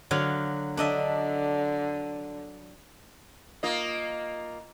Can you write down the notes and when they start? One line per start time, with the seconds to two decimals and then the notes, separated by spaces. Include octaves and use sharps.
0.11 D3 F#3 F5
0.77 D3 D4 D#5 E5
3.63 A#3 F4 D#5